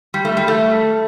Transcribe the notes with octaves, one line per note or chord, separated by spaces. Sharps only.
G3
A3
G3
A3